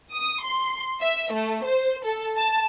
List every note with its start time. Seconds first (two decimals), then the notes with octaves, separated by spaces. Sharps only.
0.12 D#6
0.43 C6
1.02 E5
1.32 A3
1.64 C5
2.05 A4
2.37 A5